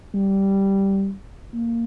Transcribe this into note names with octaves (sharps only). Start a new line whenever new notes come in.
G3
A#3